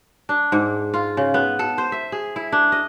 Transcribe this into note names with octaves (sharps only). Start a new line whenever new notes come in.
D4
G#2
F4
C#3
B3
A4
C5
E5
G#4
E4
D4
D#5